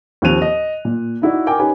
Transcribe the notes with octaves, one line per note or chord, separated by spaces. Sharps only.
D#2 F3 C4 F#6 D#7 F7
D#5
A#2
D#4 E4 F#4 D5
A#4 G5 G#5 D6
C#4 D#4 G4 B4 G#5